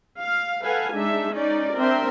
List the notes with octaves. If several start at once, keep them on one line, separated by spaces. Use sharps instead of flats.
F5
A4 B4 F5 F#5 G#5
G#3 D4 D#4 E5
C#4 D#4 D5
C4 D4 A#4 E5 G5 C6